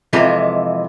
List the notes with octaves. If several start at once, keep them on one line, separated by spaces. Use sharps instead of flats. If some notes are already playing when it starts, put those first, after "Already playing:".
F2 C3 E3 G#3 F4